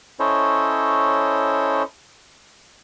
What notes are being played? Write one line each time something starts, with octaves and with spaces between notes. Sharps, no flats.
C#4 E4 A4 C5 C#5 D#5